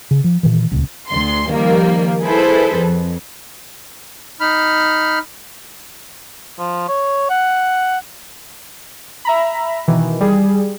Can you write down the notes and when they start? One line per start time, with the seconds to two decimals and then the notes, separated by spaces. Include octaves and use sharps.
0.11 C#3
0.24 F3
0.43 A#2 D#3 E3
0.71 D#1 C#2
1.09 D2 C6
1.50 D#3 F3 G3 A#3
2.23 E4 G#4 A4 B4 C5
2.76 F2
4.40 D#4 B5 F6
6.59 F3
6.89 C#5
7.30 F#5
9.25 E5 A#5 B5
9.88 B2 D#3 E3
10.20 G3 G#4